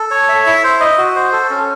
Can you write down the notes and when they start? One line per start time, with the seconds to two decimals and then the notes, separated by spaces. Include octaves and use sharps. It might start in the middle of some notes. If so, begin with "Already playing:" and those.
Already playing: A4
0.11 C#5
0.29 E5
0.46 E4
0.64 C5
0.80 D#5
0.98 F#4
1.15 C5
1.33 A4
1.50 C#4